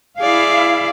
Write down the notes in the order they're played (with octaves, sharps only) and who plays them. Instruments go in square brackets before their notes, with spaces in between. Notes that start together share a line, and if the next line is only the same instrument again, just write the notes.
[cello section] E4 F5 [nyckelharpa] G#4 D5